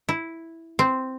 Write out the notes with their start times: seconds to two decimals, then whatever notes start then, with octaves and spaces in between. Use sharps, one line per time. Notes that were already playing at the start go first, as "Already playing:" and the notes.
0.09 E4
0.79 C4